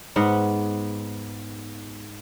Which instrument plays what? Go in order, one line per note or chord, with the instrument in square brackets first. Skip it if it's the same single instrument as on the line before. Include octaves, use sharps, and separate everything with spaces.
[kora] G#2 B3 F#5